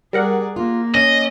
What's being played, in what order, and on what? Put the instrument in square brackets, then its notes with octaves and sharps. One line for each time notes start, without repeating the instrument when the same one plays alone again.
[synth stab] G3 A#4 F#5 [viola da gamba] G#4 D5
[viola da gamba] A#3 [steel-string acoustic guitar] F4
[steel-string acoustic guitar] C#4 [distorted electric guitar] D#5